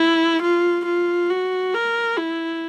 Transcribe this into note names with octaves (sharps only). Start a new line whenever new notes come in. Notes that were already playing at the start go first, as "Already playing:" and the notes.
Already playing: E4
F4
F4
F#4
A#4
E4